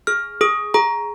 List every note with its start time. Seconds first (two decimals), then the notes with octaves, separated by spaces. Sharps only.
0.07 G#4 F6
0.41 G#4 D#6
0.74 G#4 A#5